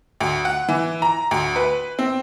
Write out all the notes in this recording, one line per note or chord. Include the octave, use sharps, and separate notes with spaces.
D2
F#5
E3
A#5
D2
B4
C4